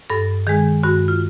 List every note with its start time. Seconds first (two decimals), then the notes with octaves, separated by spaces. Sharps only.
0.10 G2 A4
0.47 D#3 G#3 G#4
0.83 G2 F#4
1.08 F4